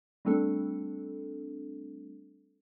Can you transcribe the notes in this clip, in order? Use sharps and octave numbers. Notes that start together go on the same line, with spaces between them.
G3 A3 C4 D4 A4